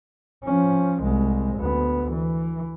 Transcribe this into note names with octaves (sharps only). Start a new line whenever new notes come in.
F3 C#4
C2 G#3
D2 B3
E3